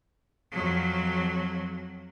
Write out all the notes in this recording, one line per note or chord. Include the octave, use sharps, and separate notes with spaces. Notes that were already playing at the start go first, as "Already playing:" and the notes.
F2 F#3